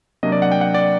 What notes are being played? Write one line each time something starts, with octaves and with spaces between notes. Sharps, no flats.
C3 F#3 A#3 D4 D#5
D5
F#5
G5
F#5
D5